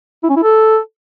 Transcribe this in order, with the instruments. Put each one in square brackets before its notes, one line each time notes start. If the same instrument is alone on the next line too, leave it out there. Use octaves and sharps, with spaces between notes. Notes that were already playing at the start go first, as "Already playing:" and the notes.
[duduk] E4
C#4
E4
A4